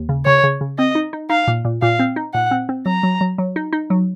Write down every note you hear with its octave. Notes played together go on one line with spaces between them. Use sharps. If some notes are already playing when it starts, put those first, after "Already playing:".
Already playing: D#2
C#3
C#3 C#5
C#3
C#3
C4 D#5
D#4
D#4
D#4 F5
A#2
A#2
A#2 F5
C4
D#4
A#2 F#5
C4
C4
F#3 A#5
F#3
F#3
F#3
D#4
D#4
F#3